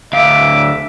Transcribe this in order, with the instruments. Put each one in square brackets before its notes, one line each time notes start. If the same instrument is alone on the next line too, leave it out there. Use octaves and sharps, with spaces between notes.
[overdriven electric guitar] D2 F5 [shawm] E5 [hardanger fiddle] D6